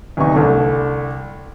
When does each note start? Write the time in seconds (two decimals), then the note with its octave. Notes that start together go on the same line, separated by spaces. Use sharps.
0.17 D2 C3 B3 D#4 C#6
0.35 C2 D3 A3